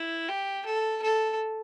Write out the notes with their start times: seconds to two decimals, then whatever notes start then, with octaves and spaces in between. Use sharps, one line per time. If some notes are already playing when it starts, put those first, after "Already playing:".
Already playing: E4
0.29 G4
0.66 A4
1.02 A4